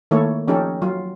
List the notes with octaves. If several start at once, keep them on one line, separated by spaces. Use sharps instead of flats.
D#3 A3 A#3 E4 A4 C#5
F3 C#4 D#4 G4 A4
F#3 F4